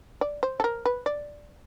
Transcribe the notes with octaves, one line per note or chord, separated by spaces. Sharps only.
D5
C5
A4
A#4
B4
D5